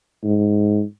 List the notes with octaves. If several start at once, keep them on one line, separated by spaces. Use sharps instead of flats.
G#2